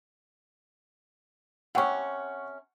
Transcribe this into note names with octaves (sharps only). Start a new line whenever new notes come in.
C3 C#4 F#5 C#6